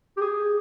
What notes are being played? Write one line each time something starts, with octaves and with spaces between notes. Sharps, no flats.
G4
G#4